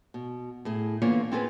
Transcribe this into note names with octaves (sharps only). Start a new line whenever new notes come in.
B2
A2 G#4
D3 E3 A#3 B3 F4 C#5
C4 F4 G#4 A4 B4